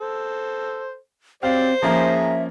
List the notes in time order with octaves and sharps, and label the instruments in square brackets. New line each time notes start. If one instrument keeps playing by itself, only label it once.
[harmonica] A4 C5
[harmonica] F#3 G4 D5 [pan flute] C4 [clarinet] C5 [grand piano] F5
[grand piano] F3 A#3 C#4 [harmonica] G#4 A#5 [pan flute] E5